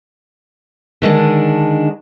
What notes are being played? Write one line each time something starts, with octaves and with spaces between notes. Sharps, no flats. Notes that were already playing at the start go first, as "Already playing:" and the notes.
D3 D#3 G#3 D4